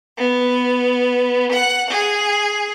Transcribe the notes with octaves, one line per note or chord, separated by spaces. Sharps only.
B3
F#5
G#4